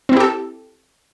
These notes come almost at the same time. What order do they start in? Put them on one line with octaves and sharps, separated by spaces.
C4 E4 G4 A4